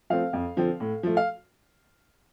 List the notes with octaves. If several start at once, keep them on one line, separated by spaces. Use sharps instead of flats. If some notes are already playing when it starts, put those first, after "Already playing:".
F3 A3 C4 F5
F2
D3 F3 C4
A2
F3 A3
F5